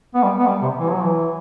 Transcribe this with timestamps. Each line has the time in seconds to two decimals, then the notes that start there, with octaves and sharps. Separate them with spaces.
0.15 B3
0.23 G3
0.39 B3
0.47 G3
0.62 C3
0.79 E3
0.92 F#3
1.03 E3